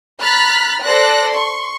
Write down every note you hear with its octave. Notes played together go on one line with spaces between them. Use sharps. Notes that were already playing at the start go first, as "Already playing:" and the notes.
A#5 B5 F6 F#6 A6 B6
A4 C5 D5 F#6 A#6
C6 C#6